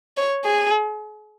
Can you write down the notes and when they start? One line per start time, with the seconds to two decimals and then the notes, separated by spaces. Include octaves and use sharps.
0.17 C#5
0.45 G#4